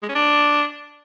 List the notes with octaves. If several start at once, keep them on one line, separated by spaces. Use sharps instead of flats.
G#3
C#4
D4